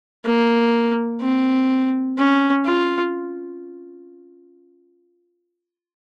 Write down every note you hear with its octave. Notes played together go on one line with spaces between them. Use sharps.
A#3
C4
C#4
F4